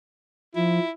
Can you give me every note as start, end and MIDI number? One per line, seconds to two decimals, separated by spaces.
0.56 0.79 53
0.56 0.90 64